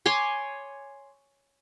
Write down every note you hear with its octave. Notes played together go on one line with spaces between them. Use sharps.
C#5 G#5 C6 D6